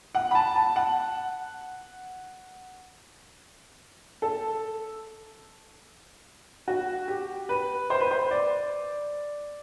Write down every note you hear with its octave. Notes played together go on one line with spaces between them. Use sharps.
F#5
B5
A5
A5
F#5
A4
F#4
G4
B4
C5
B4
C5
D5